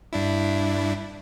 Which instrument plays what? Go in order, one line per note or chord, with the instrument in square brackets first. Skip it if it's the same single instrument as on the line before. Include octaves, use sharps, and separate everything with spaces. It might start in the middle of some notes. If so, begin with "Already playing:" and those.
[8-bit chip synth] G2 D4 E4